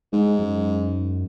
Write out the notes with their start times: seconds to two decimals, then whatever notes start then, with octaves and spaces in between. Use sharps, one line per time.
0.13 G#2 G#3
0.39 F#2